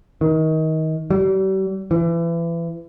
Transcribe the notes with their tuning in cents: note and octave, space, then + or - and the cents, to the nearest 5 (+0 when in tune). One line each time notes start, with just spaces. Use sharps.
D#3 +25
G3 -40
E3 +30